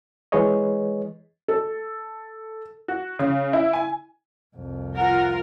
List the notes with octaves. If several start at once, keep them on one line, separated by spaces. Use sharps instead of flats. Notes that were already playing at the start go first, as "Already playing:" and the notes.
E3 G#3 G#4 B4 C#5 D#5
A4
F#4
C#3
E4
G#5
C2 F2
F4 A#4 F#5